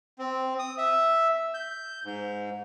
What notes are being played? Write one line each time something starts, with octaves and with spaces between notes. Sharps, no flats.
C4
D#6
E5
G6
G#2